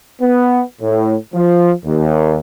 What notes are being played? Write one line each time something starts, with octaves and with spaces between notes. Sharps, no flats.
B3
A2
F3
D#2